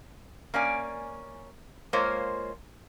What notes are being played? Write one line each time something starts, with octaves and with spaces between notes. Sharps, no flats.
A#3 C#4 D5 G#5
G#3 A#3 F4 C5 C#5